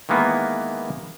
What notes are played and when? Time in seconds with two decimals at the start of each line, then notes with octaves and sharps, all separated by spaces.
0.09 D#3 E3 G#3 A#3 B3